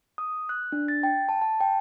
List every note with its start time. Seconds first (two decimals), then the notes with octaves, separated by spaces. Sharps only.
0.18 D#6
0.49 F#6
0.72 D4
0.88 A6
1.03 G5
1.29 A5
1.42 A5
1.61 G5